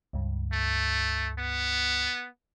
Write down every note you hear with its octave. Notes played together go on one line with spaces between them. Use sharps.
C#2 G2
A3
B3